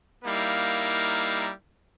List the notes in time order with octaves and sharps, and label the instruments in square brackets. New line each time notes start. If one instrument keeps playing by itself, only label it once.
[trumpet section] G3 A#3 D#4 E4 A#4 F5